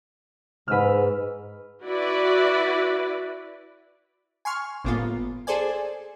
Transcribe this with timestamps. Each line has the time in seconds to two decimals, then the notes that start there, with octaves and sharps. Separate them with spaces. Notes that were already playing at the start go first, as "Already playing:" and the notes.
0.68 G#2 B4 E6 F6
1.84 E4 F#4 B4 D5
4.45 G#5 C6 C#6 F6
4.84 G1 A2 A#3 B3 F4
5.47 G#4 A4 C5 D5 G#5